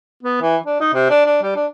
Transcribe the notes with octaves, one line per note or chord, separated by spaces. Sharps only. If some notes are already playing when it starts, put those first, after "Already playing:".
B3
E3
D4
D#4
C3
D4
D4
G3
D4